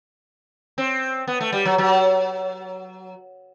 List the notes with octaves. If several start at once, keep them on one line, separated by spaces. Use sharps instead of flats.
C4
B3
A3
G3
F#3
F#3